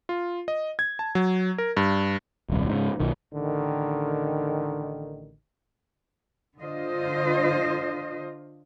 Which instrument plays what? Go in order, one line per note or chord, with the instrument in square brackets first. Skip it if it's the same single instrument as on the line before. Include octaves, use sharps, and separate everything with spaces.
[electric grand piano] F4
D#5
G#6
A5
F#3
A#4
G2
[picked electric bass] D#1 C2
G#2 C#3
B1 D#3
[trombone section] A1 D3 D#3
[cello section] D3 F4 C5 D#5